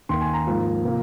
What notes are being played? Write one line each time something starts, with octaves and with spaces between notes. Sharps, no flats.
D#2 D#3 A#3 C6
G#5
A#5
G#2 F3 A#3
C3 F3 A#3